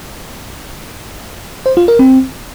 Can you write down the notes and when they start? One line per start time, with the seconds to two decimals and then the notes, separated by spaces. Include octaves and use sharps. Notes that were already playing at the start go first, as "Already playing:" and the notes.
1.66 C5
1.77 F4
1.88 A#4
1.99 C4